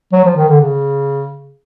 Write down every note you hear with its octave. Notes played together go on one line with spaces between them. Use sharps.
F#3
F3
D#3
D3
C#3